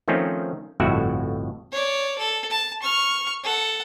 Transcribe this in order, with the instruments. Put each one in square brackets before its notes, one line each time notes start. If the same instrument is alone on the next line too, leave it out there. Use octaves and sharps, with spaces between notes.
[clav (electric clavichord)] D#3 F3 A3 C4 C#4 D#4
G1 F2 A2 F#4 E5 F#5
[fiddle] C#5 D5
A4
A5
C#6 F6
A4 F#5